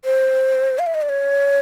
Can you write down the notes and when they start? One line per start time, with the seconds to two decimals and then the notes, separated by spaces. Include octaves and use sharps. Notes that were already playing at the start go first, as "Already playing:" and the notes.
0.05 C5
0.79 F5
0.86 E5
0.94 D#5
1.01 D5
1.09 C#5